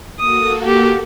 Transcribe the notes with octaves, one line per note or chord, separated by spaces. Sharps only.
A#3 F#4 A4 D#6
G4